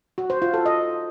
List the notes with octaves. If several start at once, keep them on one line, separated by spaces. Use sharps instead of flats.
F#4
C5
F4
A4
D#5